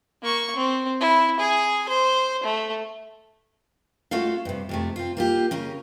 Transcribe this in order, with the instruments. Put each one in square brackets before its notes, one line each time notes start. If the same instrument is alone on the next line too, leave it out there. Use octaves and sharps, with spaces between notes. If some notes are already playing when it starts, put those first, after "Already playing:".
[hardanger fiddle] A#3 C#6
C4
E4
G#4 G#5
C5
A3
[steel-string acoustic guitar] A3 C#4 F4 F#4 A4 F5
G2 C3
F2 C3 A3
C4 F4
A#3 F4 G4
C#3 C#4 A#4